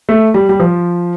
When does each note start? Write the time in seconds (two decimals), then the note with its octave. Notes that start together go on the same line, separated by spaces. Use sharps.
0.09 A3
0.34 G3
0.49 G3
0.60 F3